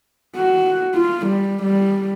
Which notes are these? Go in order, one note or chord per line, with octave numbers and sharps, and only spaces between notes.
F#4
F4
G3
G3